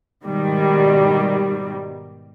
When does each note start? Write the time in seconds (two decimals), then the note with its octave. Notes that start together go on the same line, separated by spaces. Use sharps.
0.24 G#2 B2 D#3 G3